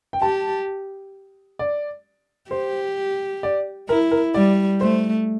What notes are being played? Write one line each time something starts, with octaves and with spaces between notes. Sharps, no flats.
G5
G4 A5
D5
G4 C5
D5
E4 A#4
A#4
G3 D5
A3 C5